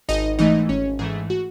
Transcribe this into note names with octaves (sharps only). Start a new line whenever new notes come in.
G#1 D#4 D#5
G#2 E3 A3 D#4 D#5
G#1 C#4 C#5
G#2 E3 A3 G#4
F#4